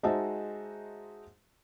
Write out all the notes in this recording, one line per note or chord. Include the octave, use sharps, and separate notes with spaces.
G#3 D#4 F#4 C5 E5 A5